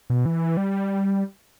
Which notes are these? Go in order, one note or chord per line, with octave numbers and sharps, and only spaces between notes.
B2
E3
G3